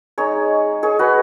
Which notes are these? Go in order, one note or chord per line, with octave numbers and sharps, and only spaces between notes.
G#3 D#4 G#4 C#5
G#4 C#5
F#4 B4